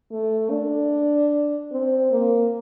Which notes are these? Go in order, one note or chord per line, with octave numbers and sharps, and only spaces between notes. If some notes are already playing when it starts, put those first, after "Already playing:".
A3
D4
C4
A#3